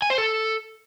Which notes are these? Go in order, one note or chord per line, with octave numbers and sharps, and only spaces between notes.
G#5
C5
A4